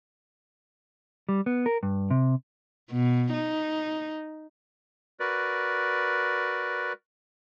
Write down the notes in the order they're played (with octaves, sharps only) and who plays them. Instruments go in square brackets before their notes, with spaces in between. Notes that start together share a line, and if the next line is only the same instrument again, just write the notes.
[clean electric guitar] G3
B3
A#4
G2
C3
[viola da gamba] B2
D#4
[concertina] F#4 A#4 B4 D5